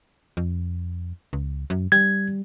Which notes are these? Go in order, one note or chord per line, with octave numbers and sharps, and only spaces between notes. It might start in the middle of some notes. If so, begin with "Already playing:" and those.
F2
C#2
F#2
G3 G#6